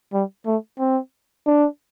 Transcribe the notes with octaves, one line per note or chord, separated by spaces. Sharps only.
G3
A3
C4
D4